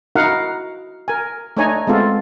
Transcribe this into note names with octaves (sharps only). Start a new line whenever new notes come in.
D#4 E4 F#4 A#4 F5 F#5
A#4 G#5
A3 D4 D#4 C#5 G#5 A#5
G#3 A3 B3 C4 F4 A4